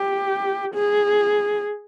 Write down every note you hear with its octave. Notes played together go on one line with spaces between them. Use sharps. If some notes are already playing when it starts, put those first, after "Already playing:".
Already playing: G4
G#4